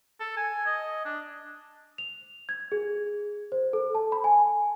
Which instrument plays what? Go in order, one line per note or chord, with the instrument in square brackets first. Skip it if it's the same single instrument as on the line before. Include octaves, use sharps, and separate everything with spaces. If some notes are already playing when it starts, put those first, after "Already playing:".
[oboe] A4
G#5
D#5
D4
[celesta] F7
G#6
G#4
C5
A4
A5
B5
G#5